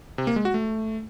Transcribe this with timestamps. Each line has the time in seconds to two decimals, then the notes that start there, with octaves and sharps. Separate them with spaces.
0.18 C3
0.27 A#3
0.36 G#3
0.45 F#4
0.54 A3